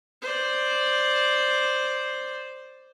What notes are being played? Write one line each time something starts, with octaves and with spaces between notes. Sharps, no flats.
C5 D5